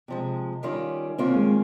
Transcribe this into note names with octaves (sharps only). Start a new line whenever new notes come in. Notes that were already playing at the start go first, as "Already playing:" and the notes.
C3 F3 G#3
D#3 G3 C#4 F4
D#2 D#3 A#3 C4 C#4 F4
G#3